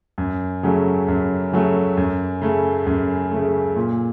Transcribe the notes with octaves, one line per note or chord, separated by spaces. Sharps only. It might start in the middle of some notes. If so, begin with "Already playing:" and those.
F#2
C#3 F#3 A3
F#2
C#3 F#3 A3
F#2
C#3 A3
F#2
C#3 A3
A#2